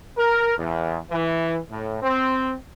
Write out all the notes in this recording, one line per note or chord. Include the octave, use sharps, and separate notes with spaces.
A#4
E2
E3
A2
C4